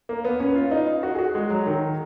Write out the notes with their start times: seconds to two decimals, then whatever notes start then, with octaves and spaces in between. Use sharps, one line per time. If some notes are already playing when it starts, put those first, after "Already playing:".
0.09 A#3
0.25 B3
0.40 C#4
0.56 F4
0.71 D#4
0.87 F4
1.03 F#4
1.15 G#4
1.19 F#4
1.35 G#3
1.50 F#3
1.66 D#3